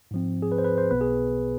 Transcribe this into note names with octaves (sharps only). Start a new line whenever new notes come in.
G#2 F3 C4
G#4
B4
C5
B4
C5
B1 B2 B3 B4
G#4